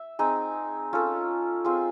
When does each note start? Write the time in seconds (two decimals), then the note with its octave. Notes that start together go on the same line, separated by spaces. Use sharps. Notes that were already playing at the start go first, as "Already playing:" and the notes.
Already playing: E5
0.19 C4 D#4 G#4
0.93 C#4 F4 A4
1.65 C4 F4 G#4